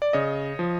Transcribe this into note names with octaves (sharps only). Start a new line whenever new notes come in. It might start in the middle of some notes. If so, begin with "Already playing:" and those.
D5
C#3 C#5 D#5
F3